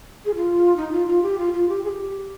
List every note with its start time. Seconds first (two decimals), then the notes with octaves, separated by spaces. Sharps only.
0.25 G#4
0.35 F4
0.76 D#4
0.92 F4
1.06 F4
1.22 G4
1.38 F4
1.53 F4
1.69 G4
1.84 G#4
1.89 G4